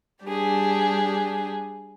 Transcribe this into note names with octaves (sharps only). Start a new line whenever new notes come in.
G3 D4 G4 G#4